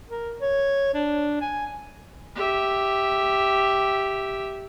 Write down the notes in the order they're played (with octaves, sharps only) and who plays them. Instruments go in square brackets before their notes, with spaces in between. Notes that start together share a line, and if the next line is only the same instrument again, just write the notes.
[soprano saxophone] A#4
C#5
D4
G#5
[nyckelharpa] G4 E5